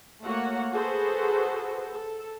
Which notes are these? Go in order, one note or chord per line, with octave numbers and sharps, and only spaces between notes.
A3 A#3 F#4 C#5 F#5
F#4 G#4 A4 B4 C5
A4